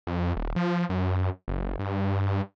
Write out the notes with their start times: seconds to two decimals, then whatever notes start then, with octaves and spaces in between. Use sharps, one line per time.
0.07 F2
0.36 D#1
0.56 F3
0.90 F#2
1.48 F#1
1.79 G2